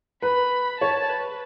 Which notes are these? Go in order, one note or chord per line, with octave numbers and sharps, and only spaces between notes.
B4 B5
C#5 A5
B4